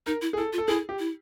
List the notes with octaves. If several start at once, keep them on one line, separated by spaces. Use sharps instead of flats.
D#4 A#4
E4
G#4
E4 A4
F4
A4
E4 G#4
G4
E4